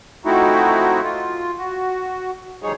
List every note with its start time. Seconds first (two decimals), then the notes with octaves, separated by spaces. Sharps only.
0.25 F3 A3 C4 D#4 E4 F#4
1.03 F4
1.58 F#4
2.63 D2 F3 G3 D#4 G#4 C#5